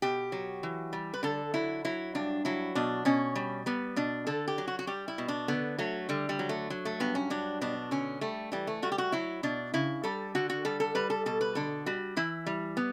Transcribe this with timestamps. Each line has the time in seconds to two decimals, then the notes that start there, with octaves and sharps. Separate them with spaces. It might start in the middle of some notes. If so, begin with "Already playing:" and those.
0.02 B2 G4
0.32 F#3
0.63 E3
0.93 G3
1.14 B4
1.23 D3 A4
1.54 F#3 E4
1.85 F#3 E4
2.15 G2 D4
2.45 F#3 E4
2.75 B2 D4
3.05 B2 C#4
3.35 G3
3.66 G3 B3
3.96 B2 D4
4.27 D3 A4
4.48 G4
4.58 F#3
4.68 F#4
4.79 F#4
4.87 G3 G4
5.08 E4
5.18 B2
5.28 D4
5.48 D3 B3
5.79 F#3 A3
6.09 D3 G3
6.29 G3
6.39 F#3
6.49 A3
6.70 F#3
6.85 A3
7.00 G2 B3
7.15 C#4
7.30 F#3 D4
7.61 B2 D4
7.91 D3 C#4
8.21 G3 A3
8.52 E3 G3
8.67 A3
8.82 G3 F#4
8.92 G4
8.98 F#4
9.12 F#3 E4
9.43 B2 D4
9.74 C#3 E4
10.03 G3 A4
10.35 D3 F#4
10.50 F#4
10.65 G3 A4
10.80 A4
10.95 G3 B4
11.10 A4
11.26 B2 A4
11.41 B4
11.55 D3 A4
11.86 G3 F#4
12.17 E3 E4
12.47 G3
12.77 B3